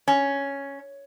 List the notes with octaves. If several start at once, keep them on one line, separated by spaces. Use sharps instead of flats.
C#4